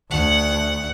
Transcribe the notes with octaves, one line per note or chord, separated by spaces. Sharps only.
D2 F#5